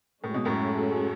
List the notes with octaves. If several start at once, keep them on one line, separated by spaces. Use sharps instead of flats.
A2 G#3 C#4 F#4 A4
B2
F#2 A2